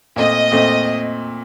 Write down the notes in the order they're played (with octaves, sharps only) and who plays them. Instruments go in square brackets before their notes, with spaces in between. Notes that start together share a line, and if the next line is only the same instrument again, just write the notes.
[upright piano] A#2 A3 C4 [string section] D#5
[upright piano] A#2 A3 C4